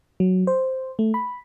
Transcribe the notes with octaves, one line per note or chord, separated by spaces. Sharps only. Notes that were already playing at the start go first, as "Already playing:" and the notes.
F#3
C5
A3
B5